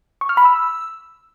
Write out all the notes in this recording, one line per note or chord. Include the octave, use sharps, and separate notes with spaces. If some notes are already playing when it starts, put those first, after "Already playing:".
C#6
F6
B5
E6